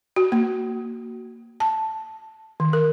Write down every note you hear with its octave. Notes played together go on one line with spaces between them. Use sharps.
F#4
A#3
A5
D#3
A#4